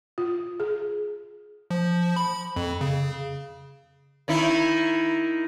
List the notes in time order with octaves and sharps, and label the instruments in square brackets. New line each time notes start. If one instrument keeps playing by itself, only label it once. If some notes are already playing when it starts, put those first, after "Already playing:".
[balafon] F4
G#4
[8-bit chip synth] F3
B5
F2
C#3
[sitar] D#3 D#4 E4